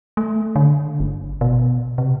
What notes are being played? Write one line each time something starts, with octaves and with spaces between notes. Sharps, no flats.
A3
D3
G1
B2
C3